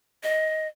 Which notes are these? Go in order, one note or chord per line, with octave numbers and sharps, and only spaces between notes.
D#5